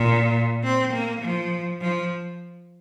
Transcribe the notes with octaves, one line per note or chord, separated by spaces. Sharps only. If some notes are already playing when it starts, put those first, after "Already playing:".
Already playing: A#2
C4
A#3
F3
F3